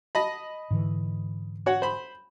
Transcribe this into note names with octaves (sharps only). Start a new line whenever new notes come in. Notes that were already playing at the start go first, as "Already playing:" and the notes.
D#5 A5 B5
G#2 D3 E3
F#4 C#5 F#5
C5 B5